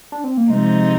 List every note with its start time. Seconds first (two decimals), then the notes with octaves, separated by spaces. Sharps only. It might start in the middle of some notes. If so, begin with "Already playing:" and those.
0.12 D4
0.24 C4
0.37 A#3
0.50 C3 F3 G#3 C4 D#4